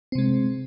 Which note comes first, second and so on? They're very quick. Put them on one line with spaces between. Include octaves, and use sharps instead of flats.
C4 C3 G#3